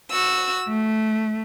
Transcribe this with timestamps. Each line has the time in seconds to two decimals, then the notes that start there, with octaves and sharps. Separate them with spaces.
0.11 F#4 E6
0.67 A3